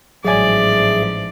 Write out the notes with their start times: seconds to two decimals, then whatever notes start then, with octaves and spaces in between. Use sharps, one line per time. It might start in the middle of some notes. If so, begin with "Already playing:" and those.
0.25 A1 G#2 F3 F#3 G#4 D5 E5 G#5